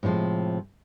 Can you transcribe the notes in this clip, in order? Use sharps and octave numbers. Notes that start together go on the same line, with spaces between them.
A2 C3 D#3 F3 G#3